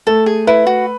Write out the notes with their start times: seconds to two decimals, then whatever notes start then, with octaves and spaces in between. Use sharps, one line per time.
0.07 A3 A4
0.26 G#4
0.47 E4 B4
0.67 F#4